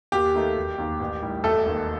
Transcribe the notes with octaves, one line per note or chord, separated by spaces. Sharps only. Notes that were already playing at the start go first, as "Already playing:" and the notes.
D#2 G4
D#3 A3 D#4
E1
D#2 D#3
A1
A2 G3 D#4
E1 A3 A4
D#2 D#3 A3